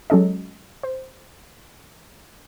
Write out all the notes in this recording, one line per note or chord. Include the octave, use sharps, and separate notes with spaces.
F#3 G#3 C#4 A4 D#5
C5